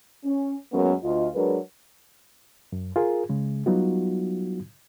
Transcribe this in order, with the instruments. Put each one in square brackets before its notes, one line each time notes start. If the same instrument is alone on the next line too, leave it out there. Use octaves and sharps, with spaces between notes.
[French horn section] C#4
F#2 F#3 G#3 A#3 B3 C#4
D2 F4 D#5
F#3 G#3 D4 A#4 B4
[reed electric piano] F#2
F4 G#4 A#4
C#3 G#3
F#3 G3 B3 D#4 F4 F#4